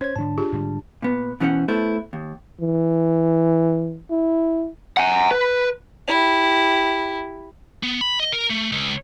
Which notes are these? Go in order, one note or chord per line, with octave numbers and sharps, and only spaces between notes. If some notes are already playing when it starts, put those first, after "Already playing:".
C#4 C5 C#5 G#6
G#2 D3 D4 A5
F4 G4 G#4
G#2 D3 G3
A#2 B3
B2 E3 C#4 A#4 C5 F#5
A3 B3 E4 A4 C5
D#2
E3
E4
F#5 G#5
B4
E4 G4
B3
B5
D#5
A#4
A3
C#2